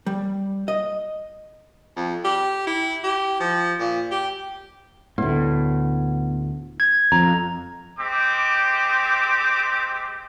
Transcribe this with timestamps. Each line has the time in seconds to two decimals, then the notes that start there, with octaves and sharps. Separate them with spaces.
0.06 G3
0.68 D#5
1.96 F2
2.25 G4
2.67 E4
3.04 G4
3.40 F3
3.79 A#2
4.11 G4
5.18 D2 A2 B3
6.80 G#6
7.12 F2 A#5
7.98 G#3 C4 G4 D6